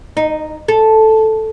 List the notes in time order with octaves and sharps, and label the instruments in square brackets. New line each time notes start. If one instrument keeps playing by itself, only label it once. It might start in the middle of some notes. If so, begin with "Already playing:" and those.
[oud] D#4
A4